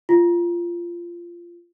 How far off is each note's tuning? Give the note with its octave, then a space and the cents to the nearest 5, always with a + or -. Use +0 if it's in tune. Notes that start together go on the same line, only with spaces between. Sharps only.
F4 -15